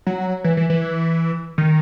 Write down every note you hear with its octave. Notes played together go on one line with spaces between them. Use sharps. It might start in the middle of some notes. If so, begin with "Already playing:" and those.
F#3
E3
E3
E3
D#3